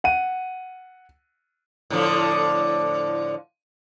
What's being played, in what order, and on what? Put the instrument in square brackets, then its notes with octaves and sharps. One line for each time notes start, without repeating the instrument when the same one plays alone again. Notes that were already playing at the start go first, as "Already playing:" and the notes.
[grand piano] F#5 D#7
[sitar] A2 D3 F3